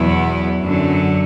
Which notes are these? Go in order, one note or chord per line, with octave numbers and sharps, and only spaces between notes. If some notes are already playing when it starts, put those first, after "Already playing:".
Already playing: E2 B2 F#3 B3 E4
F#2 D3 F#3